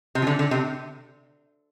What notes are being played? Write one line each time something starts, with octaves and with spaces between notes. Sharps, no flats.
C3
F3
D3
D3
C3